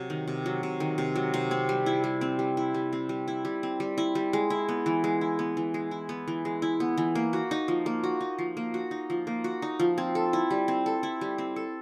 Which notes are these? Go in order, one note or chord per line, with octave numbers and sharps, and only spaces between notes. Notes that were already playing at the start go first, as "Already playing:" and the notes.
Already playing: C3 F#3
D#3
C3
F#3
C3
D#3
C3
F#3
C3
C4
G3
E4
G3
C4
G3
E4
G3
C4
G3
E4
G3
C4
G3
E4
G3
G#3
E4
B3
E3
G#3
E4
B3
E3
G#3
E4
B3
E3
G#3
E4
B3
E3
A#3
F#4
D#4
F3
A#3
F#4
D#4
F3
A#3
F#4
D#4
F3
A#3
F#4
D#4
F3
C4
A4
E4
G3
C4
A4
E4
G3
C4
A4